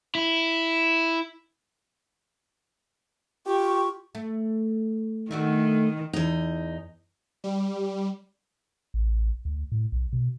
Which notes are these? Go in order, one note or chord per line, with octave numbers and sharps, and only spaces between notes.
E4
F4 G4 C#6
A3
D#3 A3 D4 F#4
E2 D#4
G3
A1
D2
A2
B1
B2